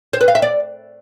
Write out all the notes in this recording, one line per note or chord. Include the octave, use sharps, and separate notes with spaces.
C5
B4
F5
E5
D5